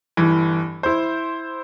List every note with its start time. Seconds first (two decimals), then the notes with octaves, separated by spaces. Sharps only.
0.17 G1 E3
0.83 E4 C5